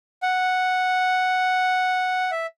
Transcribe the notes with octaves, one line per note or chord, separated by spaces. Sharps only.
F#5
E5